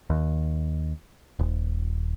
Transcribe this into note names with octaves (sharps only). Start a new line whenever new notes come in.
D#2
D#1